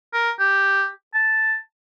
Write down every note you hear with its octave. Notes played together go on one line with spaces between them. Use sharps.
A#4
G4
A5